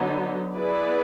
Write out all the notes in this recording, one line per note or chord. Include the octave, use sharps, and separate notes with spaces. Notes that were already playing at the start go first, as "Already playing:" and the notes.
Already playing: D3 F#3 B3 D#4
B3 E4 G#4 B4 D5